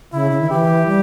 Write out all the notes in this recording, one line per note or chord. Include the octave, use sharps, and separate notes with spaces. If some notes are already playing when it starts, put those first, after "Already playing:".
C#3 E4
C#3
D#3
E3 G4
G3